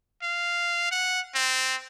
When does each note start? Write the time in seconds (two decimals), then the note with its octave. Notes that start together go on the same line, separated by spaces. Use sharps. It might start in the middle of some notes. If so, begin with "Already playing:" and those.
0.22 F5
0.92 F#5
1.35 C4